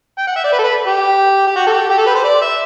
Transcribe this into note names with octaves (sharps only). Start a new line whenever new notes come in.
G5
F#5
E5
D5
B4
A4
B4
G4
G4
F#4
A4
G4
G4
A4
B4
C5
D5
E5